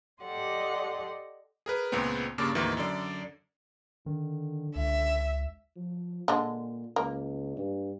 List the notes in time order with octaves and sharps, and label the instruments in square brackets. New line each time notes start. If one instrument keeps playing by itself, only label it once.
[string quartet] G4 A4 D5 D#5 F#5 C6
[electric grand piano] G#4 A#4 B4
C#2 A#2 G#3 B3 C4
G2 C#3 A#3 D4 D6 A6
D2 G#2 D#3 E3 A#3
F#2 D3 D5
[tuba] D3 [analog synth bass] D#3
[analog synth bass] C#2 [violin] E5
[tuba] F3
[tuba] A#2 [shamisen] D3 G#3
[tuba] C#2 [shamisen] A#3
[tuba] G2